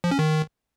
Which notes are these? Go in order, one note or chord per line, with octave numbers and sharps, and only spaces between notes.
F3
C#4
D#3